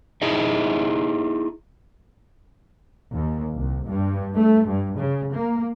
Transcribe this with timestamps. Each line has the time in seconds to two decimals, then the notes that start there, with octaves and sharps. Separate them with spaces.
0.22 D#4 E4 G#4 D#5 E5
3.13 D#2
3.55 C2
3.87 G2
4.37 A3
4.67 G2
4.97 C#3
5.35 A#3